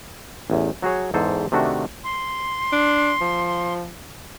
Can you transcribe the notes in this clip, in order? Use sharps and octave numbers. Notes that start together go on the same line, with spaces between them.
A1 E2
F#3 F#4 G#4 C#5
E2 G#2 A4 C5 G#5
C3 D#3 A3 D4 F#4
C6
D4
F3